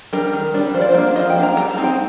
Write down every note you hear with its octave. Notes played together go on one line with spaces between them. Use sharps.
G3 D4 A#4
D#3
G3 D4
F3 C5
D5
C5
A#3 D4
F3 D#5
G5
A#3 D4
A#5
G3 A#5
A5
C4 D#4
G5